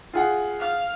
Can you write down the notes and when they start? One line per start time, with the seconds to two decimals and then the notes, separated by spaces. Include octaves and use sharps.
0.14 F4 G#4 F#5
0.60 F5